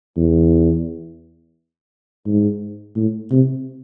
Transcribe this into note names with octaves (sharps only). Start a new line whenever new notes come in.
E2
G#2
A2
C3